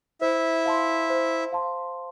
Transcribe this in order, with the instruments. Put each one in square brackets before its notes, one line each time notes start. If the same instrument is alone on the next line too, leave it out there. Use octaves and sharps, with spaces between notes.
[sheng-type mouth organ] E4 E5 [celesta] C5
[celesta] F5 A5 C6
C5
F5 A5 C6